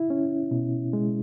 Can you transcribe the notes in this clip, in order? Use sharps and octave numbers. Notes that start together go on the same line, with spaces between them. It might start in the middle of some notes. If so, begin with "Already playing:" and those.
Already playing: E4
C#4
B2
G#3